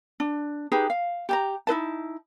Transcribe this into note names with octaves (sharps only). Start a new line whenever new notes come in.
D4
D#4 G4 G#4 B4
F5
G4 A5 A#5
D#4 E4 B4 A5